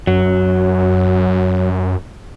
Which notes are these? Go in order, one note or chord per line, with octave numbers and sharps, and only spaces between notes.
F#2 F#3